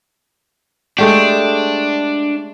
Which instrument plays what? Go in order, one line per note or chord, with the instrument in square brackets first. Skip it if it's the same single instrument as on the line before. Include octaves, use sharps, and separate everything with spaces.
[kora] G#3 A3 G4 [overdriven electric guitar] D4